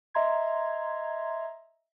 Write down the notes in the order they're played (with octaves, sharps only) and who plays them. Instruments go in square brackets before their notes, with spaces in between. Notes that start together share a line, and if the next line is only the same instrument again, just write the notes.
[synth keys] D#5 E5 A#5 C6 G#6